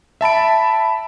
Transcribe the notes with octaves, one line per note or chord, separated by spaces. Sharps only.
E5 A5 B5 D7